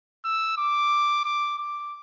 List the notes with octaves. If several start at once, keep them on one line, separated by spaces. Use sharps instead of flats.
E6
D6
D6
D6